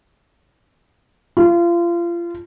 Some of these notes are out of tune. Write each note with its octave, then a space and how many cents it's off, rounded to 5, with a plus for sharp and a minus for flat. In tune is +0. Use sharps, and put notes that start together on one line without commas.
F4 -30